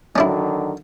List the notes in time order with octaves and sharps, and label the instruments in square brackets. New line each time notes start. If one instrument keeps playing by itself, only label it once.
[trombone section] D3 D#3 F#3 [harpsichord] C#4 D4 E4